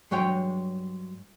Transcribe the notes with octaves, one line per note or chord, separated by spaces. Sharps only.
G2 F#3 G#3 C#5 G5